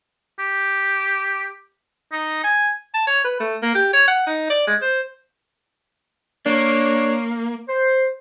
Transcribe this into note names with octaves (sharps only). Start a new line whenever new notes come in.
G4
D#4
G#5
A5
C#5
B4
A3
A#3
G4
C#5
F#5
D#4
D5
G#3
C5
A#3 D4 C#5
C5